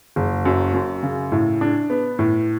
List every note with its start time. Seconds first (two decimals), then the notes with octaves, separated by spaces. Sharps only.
0.16 F#1
0.45 F#2
0.74 F#2
1.03 C#3
1.32 A2
1.61 D4
1.90 B3
2.19 A2